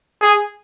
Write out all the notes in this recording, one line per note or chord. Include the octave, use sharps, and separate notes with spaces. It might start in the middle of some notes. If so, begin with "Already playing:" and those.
G#4